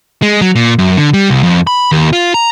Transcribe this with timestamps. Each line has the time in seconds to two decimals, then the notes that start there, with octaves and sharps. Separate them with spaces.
0.22 G#3
0.41 F#3
0.56 A#2
0.78 F#2
0.98 D3
1.13 G3
1.29 C2
1.43 F2
1.67 B5
1.92 D#2
2.13 F4
2.34 A#5